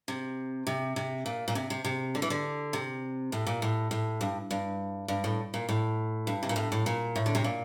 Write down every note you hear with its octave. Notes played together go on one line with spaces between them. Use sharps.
C3
C3
C3
A#2
A#2
C3
C3
C3
D3
E3
D3
C3
A2
A#2
A2
A2
G2
G2
G2
A2
A#2
A2
G2
C3
A#2
A2
A2
A#2
A2
D3
C3
A#2